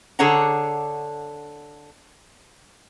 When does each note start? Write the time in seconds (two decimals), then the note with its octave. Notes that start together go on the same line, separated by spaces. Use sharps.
0.19 D3 G#4 A4 C#5 F#5 A#5